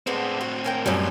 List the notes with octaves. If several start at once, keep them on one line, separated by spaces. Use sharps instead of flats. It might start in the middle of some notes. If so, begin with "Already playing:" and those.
A2 G#3 B3 C4 D4
F#4
C#4 A#4 G5
F#2 B2 G3 C#4 D#5